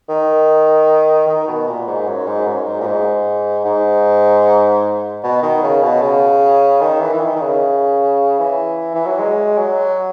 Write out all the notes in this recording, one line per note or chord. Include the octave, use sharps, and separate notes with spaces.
D#3
D#3
B2
A#2
G#2
F#2
G#2
F#2
G#2
A#2
G#2
G#2
B2
D#3
C#3
B2
C#3
D#3
E3
E3
D#3
D#3
C#3
E3
E3
F#3
G#3
F#3